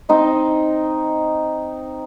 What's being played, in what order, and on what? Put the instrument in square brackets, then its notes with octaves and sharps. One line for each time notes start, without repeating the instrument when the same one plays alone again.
[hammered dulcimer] C4 D#4 D#5